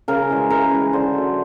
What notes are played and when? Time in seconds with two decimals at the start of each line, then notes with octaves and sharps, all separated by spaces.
0.08 C#3 A#4
0.30 E3 G#3
0.50 C#3 A#4
0.61 B4
0.72 E3 G#3
0.93 D3 C5
1.14 F#3 A3